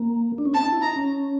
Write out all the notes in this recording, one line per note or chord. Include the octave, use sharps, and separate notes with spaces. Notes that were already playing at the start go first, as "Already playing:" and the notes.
Already playing: A#3
D4
C#4
C4 A5
D#4
E4
D#4 A#5
C#4